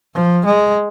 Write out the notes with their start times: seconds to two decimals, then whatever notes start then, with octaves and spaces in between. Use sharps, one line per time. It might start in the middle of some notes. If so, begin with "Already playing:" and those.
0.14 F3
0.45 G#3